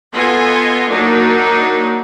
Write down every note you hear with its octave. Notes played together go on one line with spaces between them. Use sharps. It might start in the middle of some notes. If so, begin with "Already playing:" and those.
B3 F4 A4 D#5 G#5
F#3 A#3 D4 D#4